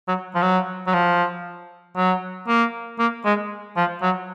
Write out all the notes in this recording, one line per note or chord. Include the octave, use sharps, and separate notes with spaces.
F#3
F3
F#3
F#3
F3
F#3
A#3
A#3
G#3
F3
F#3